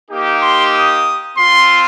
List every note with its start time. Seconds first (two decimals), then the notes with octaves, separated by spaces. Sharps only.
0.11 A#3 D#4 G4
0.42 C6
0.74 D#6
1.37 C4 F4 C6